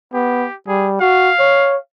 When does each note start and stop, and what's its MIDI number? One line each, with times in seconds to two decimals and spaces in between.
0.14 0.47 59
0.14 0.54 67
0.68 0.96 55
0.68 0.89 68
1.01 1.31 66
1.01 1.79 77
1.39 1.77 73